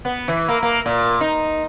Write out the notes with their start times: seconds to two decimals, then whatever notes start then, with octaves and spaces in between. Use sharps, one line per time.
0.05 B3
0.28 E3
0.48 A#3
0.63 A#3
0.86 A#2
1.21 D#4